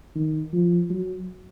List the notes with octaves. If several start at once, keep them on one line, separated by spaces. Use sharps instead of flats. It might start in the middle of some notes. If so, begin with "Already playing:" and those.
D#3
F3
F#3